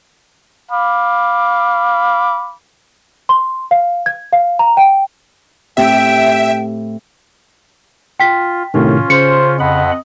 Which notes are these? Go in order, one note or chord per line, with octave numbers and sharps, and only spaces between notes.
F5 B5 D6
C6
F5
G#6
F5
A#5
G5
A2 C4 G4 E5 G5
F4 G5 B6
A2 C3 D#3 C#4 F4
C#3 C5 C#7
F2 D#5 F#5 B5